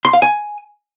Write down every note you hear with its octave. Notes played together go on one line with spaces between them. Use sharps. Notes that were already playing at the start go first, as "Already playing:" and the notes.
C6
F5
G#5